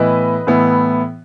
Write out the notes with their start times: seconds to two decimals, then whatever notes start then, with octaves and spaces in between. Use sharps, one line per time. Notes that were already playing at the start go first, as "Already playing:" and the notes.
Already playing: A2 E3 B3 E4 B4 D#5
0.47 A2 E3 B3 E4